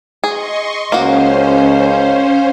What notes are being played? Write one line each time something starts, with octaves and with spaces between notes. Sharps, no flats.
G#4 D#5 C6 C#6
C#2 A#3 C#4 F#4 C5 F5